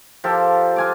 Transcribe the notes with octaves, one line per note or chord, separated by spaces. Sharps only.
F3 G4 A4 A#4
F4 G#5 D6